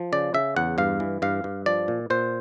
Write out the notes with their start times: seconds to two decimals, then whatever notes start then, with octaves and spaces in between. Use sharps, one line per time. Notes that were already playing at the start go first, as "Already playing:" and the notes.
Already playing: F3
0.12 C#3 D5
0.34 C#3 E5
0.56 E2 F#5
0.78 G2 F5
1.00 E3
1.22 G2 F5
1.44 G2
1.66 F3 D5
1.88 A#2
2.10 A#2 C5